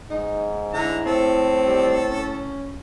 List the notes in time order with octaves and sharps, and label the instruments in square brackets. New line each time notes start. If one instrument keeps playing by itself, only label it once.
[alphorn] G#2 [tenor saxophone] D#4
[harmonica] D3 A#5 [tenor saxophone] E4
[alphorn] A2 [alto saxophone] C4 [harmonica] A4
[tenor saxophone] G3
C#4